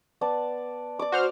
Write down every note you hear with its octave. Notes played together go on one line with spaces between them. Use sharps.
B3 D5 A5
D5 D6
F#4 C5 F6